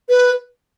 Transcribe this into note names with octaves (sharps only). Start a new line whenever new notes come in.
B4